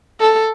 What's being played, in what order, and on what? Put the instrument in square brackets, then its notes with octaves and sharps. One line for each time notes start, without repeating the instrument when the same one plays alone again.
[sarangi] A4